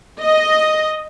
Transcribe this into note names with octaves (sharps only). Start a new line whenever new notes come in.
D#5